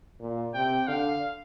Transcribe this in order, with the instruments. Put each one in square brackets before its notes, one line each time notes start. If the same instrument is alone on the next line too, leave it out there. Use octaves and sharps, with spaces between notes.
[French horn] A#2
[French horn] C3 [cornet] G5
[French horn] D3 [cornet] F5